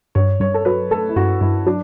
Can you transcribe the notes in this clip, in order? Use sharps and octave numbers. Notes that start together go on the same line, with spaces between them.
G2 C#5
G2 C#5
A4
F#3 B4
A3 A4
E4
G2 F#4
G2 E4
F#3 D4